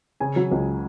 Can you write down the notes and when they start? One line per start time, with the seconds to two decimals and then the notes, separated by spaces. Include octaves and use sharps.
0.20 C#3 G#5
0.36 F#3
0.51 C#2